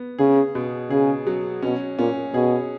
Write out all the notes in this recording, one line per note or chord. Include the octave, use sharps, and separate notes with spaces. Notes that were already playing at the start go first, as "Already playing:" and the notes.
Already playing: B3
C#3 G#4
B2
C#3 G#4
F#3
B2 C#4
A#2 C#4
B2 G#4